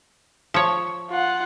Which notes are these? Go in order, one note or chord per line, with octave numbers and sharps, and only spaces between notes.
F3 C#5
F4 F#5